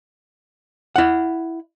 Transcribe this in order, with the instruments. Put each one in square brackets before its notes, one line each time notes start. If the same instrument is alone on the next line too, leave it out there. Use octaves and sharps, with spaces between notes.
[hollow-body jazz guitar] E4 F#5